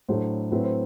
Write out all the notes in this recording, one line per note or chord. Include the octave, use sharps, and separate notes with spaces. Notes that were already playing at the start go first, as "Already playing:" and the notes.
A2 F#3 A3 D4 C5
A2 F#3 C4 E4 B4
C5